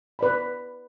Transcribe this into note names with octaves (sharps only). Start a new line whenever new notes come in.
B4 D5 B5